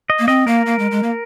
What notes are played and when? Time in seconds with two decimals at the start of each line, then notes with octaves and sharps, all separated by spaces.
0.10 D#5
0.19 A#3
0.28 C4 D#5
0.47 A#3 A#4
0.66 A#3
0.79 G#3
0.91 G#3
1.03 A#3